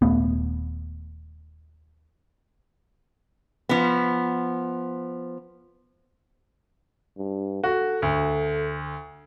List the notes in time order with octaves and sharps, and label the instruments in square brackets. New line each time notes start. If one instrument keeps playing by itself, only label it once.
[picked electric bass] D#1 A3 B3
[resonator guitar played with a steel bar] F3 B3
[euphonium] G2
[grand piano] F#4 [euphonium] A4
[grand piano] D2